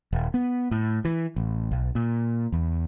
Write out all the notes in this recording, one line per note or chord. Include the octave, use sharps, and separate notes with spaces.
D#1
B3
A2
E3
A1
B1
A#2
E2